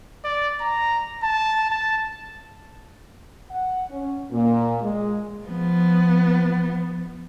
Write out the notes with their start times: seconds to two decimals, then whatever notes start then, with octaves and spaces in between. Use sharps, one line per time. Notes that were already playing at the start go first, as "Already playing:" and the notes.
0.25 D5
0.61 A#5
1.23 A5
1.70 A5
3.51 F#5
3.90 C#4
4.32 A#2
4.82 G#3
5.46 F3 B3